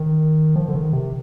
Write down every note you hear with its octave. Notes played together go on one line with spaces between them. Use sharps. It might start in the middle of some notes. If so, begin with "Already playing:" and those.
Already playing: D#3
F3
D3
D#3
C3